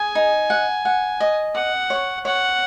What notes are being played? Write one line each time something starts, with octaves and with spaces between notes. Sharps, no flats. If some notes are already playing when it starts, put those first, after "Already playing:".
Already playing: G#4 G#5
D#4
F#5
F#5
D#5
F#5 D#6
C#5
C#5 F#5